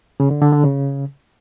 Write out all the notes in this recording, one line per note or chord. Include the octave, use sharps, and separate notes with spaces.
C#3
D3
D3
D3
C#3